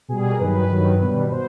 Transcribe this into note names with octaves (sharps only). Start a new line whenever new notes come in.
B2 G3 G#4
A#4
G2 D#3 F#3 B4
G2 D#3 F#3
B2 G3
B4
B2 C5